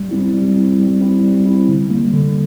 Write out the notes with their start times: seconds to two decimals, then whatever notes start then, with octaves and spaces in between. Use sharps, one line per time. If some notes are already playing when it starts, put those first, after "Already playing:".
Already playing: G3
0.11 C4 E4
0.34 G3
0.56 C4 E4
0.79 G3
1.01 C4 E4
1.24 G3
1.46 E4
1.51 C4
1.68 D3
1.90 G3 A#3
2.13 D3